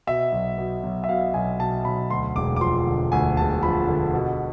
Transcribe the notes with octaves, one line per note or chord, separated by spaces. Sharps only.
B2 E5
B1
B2
B1
E5
B2 F5
B1 G#5
B2 A5
B1 B5
D2 C6
E1 D6
D6
F3 C6
D3
D2 G#5
E1 A5
F3 B5
D3
B2